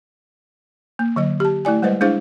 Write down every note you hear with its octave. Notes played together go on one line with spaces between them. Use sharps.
A#3
D3 F#3 D#5
G4 A5
A3 E4 D5 G#5
G3 G#3 B4 C5 D#5
G#3 D4 E4 G#4 C5 F5